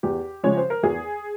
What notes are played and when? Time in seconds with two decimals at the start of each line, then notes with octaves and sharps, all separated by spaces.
0.03 E2 G4
0.43 C#3 F3 G#3 C#5
0.57 C5
0.70 A#4
0.83 E2 G#4